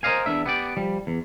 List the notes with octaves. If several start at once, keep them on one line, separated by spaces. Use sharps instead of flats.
A#4 C5 D5 D#5 F5 G#5
E2 D4 E5
B3 G4 D5
F3 G3
E2